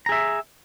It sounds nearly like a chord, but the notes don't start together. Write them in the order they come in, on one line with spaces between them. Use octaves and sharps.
A#5 G#4 E5